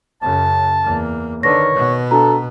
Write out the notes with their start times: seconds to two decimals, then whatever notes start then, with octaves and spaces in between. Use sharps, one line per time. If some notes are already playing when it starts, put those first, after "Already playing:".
0.22 F#2 C#3 A5
0.83 E2 A#3
1.43 D3 D#3 B4 C#5 A#6
1.74 B2 B3
2.11 D4 F#4 A4 A#5